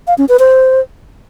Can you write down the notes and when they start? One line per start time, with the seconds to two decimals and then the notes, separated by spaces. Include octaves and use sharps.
0.07 F5
0.18 C#4
0.29 B4
0.39 C5